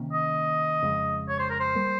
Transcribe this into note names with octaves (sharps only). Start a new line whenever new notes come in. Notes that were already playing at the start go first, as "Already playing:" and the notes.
Already playing: C3 D#3 A#3 C#4
D#5
F2 C#3 F3 G#3
C#5
C5
A#4
C5
G3 A#3